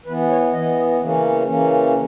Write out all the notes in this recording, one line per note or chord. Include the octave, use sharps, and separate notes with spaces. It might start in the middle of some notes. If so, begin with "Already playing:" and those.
E3 B3 B4
C#5
E3 B3 D#5
C#3 E3 A#3 C#4
C#3 E3 A#3 C#4